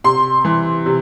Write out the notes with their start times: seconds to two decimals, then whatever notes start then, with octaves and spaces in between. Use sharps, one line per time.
0.04 C3 C6
0.45 E3
0.86 C3